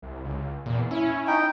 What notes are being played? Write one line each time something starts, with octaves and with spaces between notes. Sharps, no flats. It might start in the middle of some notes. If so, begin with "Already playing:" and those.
C2
C#2
E2 A#2
C#4 E4
D#4 G5